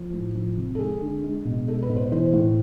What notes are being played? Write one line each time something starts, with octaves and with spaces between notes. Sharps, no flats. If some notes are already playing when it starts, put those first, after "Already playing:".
Already playing: F3
A2
F3
C3
A4
G#3 G#4
D3
G#3
B2
G#3 A4
B4
B2
C5
E3 C5
A2